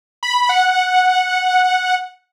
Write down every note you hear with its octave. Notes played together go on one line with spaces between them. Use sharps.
B5
F#5